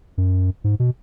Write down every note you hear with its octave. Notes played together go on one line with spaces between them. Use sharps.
F#2
G#2
B2